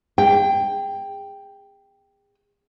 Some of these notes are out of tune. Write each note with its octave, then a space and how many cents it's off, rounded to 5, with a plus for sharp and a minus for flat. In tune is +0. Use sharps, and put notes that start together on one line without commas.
G#4 -30 G5 +0